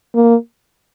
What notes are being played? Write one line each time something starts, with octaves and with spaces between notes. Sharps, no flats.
A#3